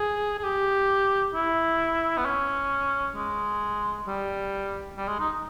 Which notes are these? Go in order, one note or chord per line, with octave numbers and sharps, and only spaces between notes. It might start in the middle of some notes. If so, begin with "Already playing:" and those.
Already playing: G#4
G#4
G4
E4
B3
C#4
G#3
G3
G3
G#3
D#4